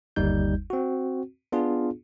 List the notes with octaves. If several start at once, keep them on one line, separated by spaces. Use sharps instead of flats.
G1 D#2 G3 D#4 G6
C4 F#4
B3 D4 F4 G#4